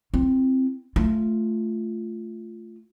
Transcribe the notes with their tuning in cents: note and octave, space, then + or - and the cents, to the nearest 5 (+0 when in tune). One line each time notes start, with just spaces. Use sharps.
C4 +0 E4 +40
A3 +0 F4 -10